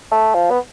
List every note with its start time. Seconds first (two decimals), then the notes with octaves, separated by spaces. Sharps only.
0.11 A3
0.35 F3
0.50 B3